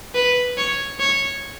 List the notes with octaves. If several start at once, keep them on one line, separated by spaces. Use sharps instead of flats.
B4
C#5
C#5